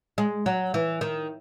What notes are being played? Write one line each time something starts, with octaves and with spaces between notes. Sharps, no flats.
G#3
F#3
E3
D#3